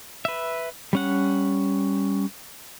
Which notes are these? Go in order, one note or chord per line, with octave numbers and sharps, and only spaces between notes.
B4 E5
G3 C#4 F#5